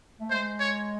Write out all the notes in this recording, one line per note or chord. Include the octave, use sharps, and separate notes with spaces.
A3
G#3 C5
C#5